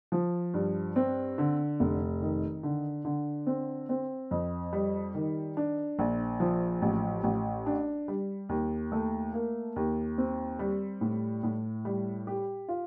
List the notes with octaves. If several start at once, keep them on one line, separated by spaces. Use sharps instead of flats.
F3
G2
C4
D3
F1
D#3
D3
D3
C4
C4
F2
G3
D#3
D4
A#1
F3
A1
A1
D4
G3
D#2
A3
A#3
D#2
C4
G3
A2
A2
G3
G4
F4